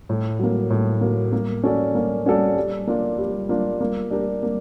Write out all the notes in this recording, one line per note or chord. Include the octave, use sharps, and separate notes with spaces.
A2
F#3 A#3
A2
F#3 A#3
A#3
C#4 F#4 A4 D5
A#3
C#4 F#4 A4 D5
G3
A#3 D4 F4
G3
A#3 D4 F4
A#3
D4 G4 A#4
A#3